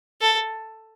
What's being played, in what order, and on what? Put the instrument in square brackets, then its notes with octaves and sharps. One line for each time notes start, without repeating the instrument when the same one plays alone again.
[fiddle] A4